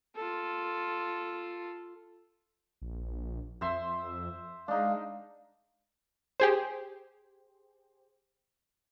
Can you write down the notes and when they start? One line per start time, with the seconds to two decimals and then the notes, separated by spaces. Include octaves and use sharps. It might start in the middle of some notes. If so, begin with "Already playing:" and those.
0.16 F4 A4
2.81 A#1
3.61 F2 C5 E5 C6
4.68 G#3 D4 D#4 F5
6.40 G4 G#4 C5